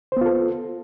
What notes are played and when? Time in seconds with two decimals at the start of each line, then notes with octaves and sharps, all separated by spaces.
0.12 C5
0.17 B3
0.21 F4
0.26 A4